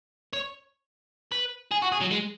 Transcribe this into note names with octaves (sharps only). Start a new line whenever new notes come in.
C#5
B4
G#4
F#4
G#4
F#3
G#3